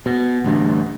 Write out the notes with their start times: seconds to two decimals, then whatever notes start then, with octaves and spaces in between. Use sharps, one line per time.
0.06 B2
0.44 A1 D2 G2